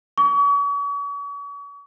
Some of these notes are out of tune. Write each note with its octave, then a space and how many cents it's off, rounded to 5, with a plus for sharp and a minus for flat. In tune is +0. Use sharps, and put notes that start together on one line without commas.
C#6 +40